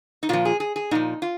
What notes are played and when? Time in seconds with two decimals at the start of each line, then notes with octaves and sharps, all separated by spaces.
0.23 D#4
0.29 A#2 F3 F4
0.45 G#4
0.60 G#4
0.76 G#4
0.91 A#2 F3 D#4
1.22 F4